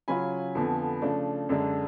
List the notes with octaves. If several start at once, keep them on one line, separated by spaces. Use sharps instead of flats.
C#3 F#3 C#4 F4 G#5 B5
F2 D3 F3 B3
C#3 F3 A3 D4
F#2 D3 G#3 D4